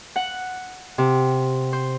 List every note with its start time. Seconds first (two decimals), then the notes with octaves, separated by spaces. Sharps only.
0.16 F#5
0.98 C3
1.73 C5